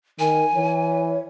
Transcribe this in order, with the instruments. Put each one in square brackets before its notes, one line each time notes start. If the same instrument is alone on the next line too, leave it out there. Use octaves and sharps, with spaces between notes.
[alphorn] D#3 [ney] A#4 [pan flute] G#5
[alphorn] E3 [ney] C#5